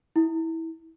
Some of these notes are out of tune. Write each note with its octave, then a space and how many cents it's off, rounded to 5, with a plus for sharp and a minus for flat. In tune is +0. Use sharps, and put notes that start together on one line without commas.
E4 -20